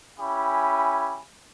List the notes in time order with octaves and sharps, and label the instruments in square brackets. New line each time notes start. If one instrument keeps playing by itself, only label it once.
[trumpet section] C#4 E4 G4 G#5 B5